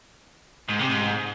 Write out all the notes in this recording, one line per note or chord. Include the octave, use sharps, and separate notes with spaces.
G#2
C3
G#2